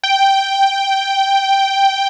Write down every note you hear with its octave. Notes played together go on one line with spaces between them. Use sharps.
G5